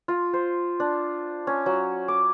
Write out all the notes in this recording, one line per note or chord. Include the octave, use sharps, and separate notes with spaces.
F4
C5
D4
C#4
F#3
D6